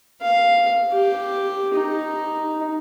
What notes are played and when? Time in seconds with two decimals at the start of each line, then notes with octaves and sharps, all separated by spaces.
0.22 F5
0.92 G4
1.74 D#4